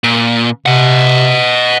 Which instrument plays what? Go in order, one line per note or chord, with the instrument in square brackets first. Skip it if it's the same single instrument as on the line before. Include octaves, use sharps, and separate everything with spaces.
[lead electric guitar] A#2
[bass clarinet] C3 [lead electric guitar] D#5 F#5